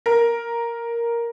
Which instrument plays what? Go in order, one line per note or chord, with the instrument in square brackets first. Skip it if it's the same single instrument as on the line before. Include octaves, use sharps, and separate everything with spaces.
[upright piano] A#4